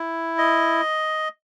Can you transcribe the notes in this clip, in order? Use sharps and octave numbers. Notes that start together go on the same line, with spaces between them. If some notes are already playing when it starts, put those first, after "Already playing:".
Already playing: E4
D#5